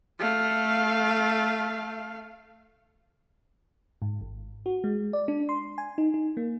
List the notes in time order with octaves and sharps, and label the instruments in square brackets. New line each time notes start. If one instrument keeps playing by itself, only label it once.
[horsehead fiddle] A3 F5
[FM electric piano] G#2
G#1
F#4
G#3
D5
D4
C6
G#5
D#4
D#4
A#3